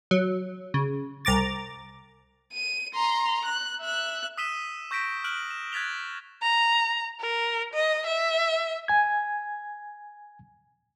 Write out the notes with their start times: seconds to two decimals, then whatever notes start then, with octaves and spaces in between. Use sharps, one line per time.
0.11 F#3
0.74 C#3
1.25 C2 A#5 D6 A6
2.52 D#7
2.94 A#5 C6
3.45 F#6
3.81 E5 F#6
4.38 D#6 E6 B6 D#7 E7 G7
4.91 C#6 G6 A#6 B6 D7
5.24 F6 F#6 D7 F#7
5.51 E7
5.72 F#6 G#6 A6 B6 F7 G7
6.42 A#5
7.20 A#4
7.74 D#5
8.06 E5
8.88 G#5 G#6